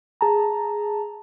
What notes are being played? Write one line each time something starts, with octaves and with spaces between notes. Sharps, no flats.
G#4 A5 A#5